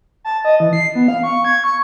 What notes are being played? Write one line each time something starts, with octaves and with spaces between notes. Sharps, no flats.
A5
D#5
E3
C7
B3
F5
C#6
G#6
C#6